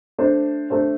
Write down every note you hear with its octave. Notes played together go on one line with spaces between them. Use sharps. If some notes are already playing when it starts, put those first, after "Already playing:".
A3 D4 A4 C5
A3 D4 A4 C5